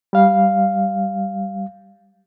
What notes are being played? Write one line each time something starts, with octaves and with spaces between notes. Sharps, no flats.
G3 F5